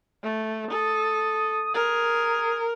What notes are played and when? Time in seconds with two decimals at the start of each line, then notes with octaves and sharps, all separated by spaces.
0.23 A3
0.71 A4 D#6
1.74 G#4 A#4